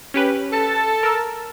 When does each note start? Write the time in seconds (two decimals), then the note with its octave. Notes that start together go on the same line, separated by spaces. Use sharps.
0.14 C#4 G4 B4
0.51 A4 A5
1.03 A#4 E6